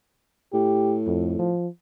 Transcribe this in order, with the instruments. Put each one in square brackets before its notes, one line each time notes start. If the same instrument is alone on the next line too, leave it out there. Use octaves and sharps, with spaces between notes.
[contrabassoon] A2 [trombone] G4
[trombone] F2
F3